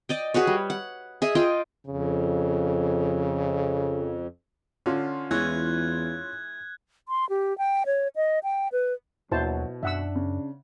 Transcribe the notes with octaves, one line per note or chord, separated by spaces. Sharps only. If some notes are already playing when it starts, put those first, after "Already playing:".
D5 D#5 G5
F#4 G#4 B4 C#5
G3
F#5
G#4 D#5 E5
F4 D#5 G5
F2 C#3
D3 C#4 F4
E2 E3 G#3 C#5 F#6 G#6
C6
G4
G5
C#5
D#5
G5
B4
A#1 D#2 B2 F#3 E4 C5 A5
F#2 D4 E5 F#5 E6
C#3